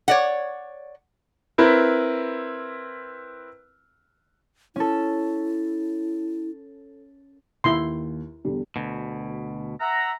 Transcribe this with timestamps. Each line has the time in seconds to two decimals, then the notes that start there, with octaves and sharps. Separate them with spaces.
0.08 C#5 D5 F#5
1.58 C4 E4 A#4 B4
4.76 C#4 E4 A4
7.64 D#2 E4 C6
8.45 E2 D3 G3
8.76 D2 B2
9.79 E5 F#5 A#5